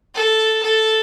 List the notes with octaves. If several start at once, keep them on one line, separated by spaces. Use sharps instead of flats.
A4
A4